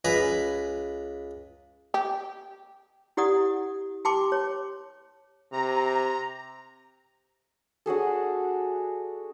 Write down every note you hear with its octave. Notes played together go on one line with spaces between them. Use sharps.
C#2 B4 G#5 A#5 B5
G4
E4 G4 D5 F#5 D#6
G4 G5 A5 C6 D6
C#5
C3 A#5
D4 F#4 G#4 A4